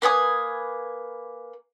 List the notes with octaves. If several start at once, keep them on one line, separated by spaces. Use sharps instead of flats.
A#3 B4 G#5 D#6